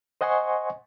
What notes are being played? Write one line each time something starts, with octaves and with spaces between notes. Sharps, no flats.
C5 D#5 F#5 G#5 C6 C#6